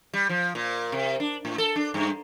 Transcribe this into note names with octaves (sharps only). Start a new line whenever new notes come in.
G3
F3
A#2
C3
D4
A2
A4
D4
G2